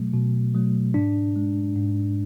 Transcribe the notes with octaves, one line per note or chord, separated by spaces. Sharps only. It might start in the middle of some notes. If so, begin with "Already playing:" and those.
Already playing: B2 F#3 A3
B2
F#3 A3
G#2 D4
G#3
G#2